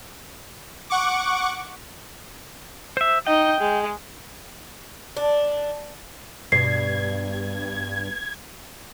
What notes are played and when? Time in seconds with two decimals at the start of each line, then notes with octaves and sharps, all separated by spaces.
0.90 F#5 C#6 D6
2.97 C5 E5
3.27 D#4 D#5 G5
3.60 G#3
5.17 D4
6.52 G2 B2 G3 G#6 C7